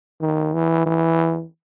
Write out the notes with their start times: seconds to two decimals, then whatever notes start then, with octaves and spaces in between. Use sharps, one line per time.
0.21 D#3
0.54 E3
0.86 E3